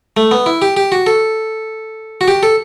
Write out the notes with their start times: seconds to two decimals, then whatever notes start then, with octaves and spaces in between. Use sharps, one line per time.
0.17 A3
0.31 B3
0.46 E4
0.62 G4
0.77 G4
0.92 F#4
1.06 A4
2.21 F#4
2.28 G4
2.43 A4